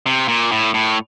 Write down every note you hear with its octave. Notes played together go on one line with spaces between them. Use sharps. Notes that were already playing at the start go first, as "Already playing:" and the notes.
C3
A#2
A2
A2